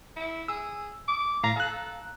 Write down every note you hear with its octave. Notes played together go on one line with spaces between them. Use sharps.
E4
G#4 E6
D6
A2 F5 A#5
A4 F5 A#5 F#6